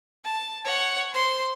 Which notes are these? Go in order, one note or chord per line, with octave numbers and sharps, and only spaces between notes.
A5
C#5 F#5
C5 C6